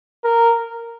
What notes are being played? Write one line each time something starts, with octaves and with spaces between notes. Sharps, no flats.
A#4